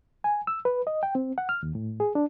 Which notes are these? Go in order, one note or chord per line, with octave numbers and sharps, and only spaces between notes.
G#5
E6
B4
D#5
G5
C4
F#5
F6
D#2
A2
G#4
D4